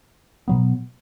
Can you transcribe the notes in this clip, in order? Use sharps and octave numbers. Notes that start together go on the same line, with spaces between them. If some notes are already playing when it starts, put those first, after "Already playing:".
B2 F#3 B3